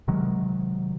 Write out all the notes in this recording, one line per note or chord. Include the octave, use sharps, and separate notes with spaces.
C3 D#3 F#3 G#3